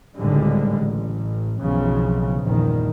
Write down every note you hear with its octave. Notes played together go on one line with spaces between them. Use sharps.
G#1 C#2 A2 D3 G3 G#3
A1
B1 F2 C#3 E3
A#1 E2 G2 D#3